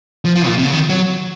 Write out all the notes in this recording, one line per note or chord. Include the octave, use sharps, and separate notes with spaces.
F3
F3
A#2
C3
C#3
D#3
F#3